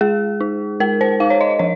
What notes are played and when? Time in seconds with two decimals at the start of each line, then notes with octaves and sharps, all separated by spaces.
0.01 G#3 G#4
0.41 D#4
0.80 G#3 A#4
1.01 C5
1.20 D#4 F5
1.30 C#5
1.41 D#5
1.59 F3 C#5